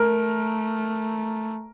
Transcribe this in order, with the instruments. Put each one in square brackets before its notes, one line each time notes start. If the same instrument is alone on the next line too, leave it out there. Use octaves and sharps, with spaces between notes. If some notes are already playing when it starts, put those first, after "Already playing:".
Already playing: [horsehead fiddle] A3 [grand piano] A#4